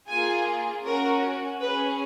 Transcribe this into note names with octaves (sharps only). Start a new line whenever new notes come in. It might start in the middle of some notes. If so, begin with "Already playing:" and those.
A#3 F4 G#4 G#5
C#4 F#4 A#4
C#4 G#4 B4